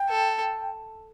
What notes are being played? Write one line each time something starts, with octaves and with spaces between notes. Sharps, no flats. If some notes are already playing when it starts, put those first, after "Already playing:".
Already playing: G5
A4